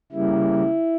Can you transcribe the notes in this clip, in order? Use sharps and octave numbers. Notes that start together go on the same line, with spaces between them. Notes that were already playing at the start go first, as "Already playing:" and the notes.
C#3 G3 A#3 E4